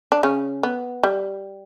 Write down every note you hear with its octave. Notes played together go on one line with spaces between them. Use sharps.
D4
C#3 C#4
B3
G3